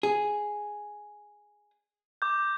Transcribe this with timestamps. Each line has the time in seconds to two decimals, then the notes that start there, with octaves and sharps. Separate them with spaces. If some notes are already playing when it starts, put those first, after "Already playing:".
0.03 G#4
2.22 D6 G6